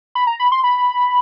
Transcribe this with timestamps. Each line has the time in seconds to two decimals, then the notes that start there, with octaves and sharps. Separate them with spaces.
0.15 B5
0.27 A#5
0.40 B5
0.52 C6
0.64 B5